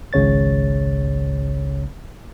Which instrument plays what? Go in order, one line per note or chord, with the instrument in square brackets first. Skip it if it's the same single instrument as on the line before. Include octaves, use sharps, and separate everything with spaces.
[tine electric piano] G#1 C#2 C#3 C#5 A6